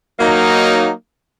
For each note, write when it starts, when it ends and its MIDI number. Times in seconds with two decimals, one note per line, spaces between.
0.20 0.91 54
0.20 0.91 58
0.20 0.91 63